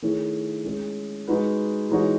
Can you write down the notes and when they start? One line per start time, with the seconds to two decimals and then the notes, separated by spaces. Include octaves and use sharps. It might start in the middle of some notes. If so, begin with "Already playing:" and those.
0.02 D#3 A3 E4 G#4 C#5
0.64 G#3 C#4 G#4
1.27 G#3 D#4 F#4 B4
1.90 E3 G#3 D#4 F#4 C#5